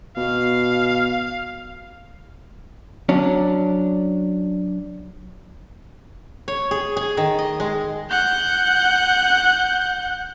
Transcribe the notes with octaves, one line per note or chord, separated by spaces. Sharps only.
B2 F5
F#3 C#4 D4
C#5
G#4
G#4
D#3
D#5
G#3
F#5 G6